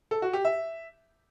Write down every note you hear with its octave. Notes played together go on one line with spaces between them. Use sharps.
A4
F#4
G4
E5